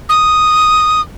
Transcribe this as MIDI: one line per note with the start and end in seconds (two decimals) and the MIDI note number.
0.09 1.01 87